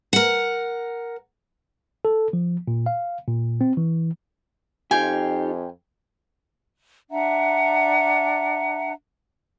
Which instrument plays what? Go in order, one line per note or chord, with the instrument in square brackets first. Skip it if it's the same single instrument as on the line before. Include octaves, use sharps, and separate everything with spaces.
[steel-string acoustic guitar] A#4 F#5
[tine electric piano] A4
F3
A#2
F5
A#2
C4
E3
[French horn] F2 [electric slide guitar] D#4 F4 G4 [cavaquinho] G5 G#5
[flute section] D4 E5 F#5 A#5